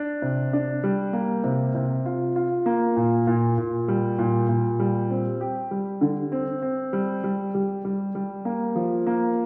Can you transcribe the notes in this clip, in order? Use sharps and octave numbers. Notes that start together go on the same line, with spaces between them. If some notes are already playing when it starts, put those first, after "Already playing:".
Already playing: D4
C3
D4
G3
A#3
C3
C3
F4
F4
A#3
A#2
A#2
A#2
G3
A#2
A#2
G3
C4
G4
G3
D3
C4
C4
G3
G3
G3
G3
G3
A#3
F3
A#3